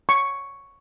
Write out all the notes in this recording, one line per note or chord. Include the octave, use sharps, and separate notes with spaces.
C#6